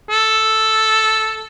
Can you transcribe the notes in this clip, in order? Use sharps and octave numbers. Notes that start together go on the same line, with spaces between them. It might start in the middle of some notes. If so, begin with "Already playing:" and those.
A4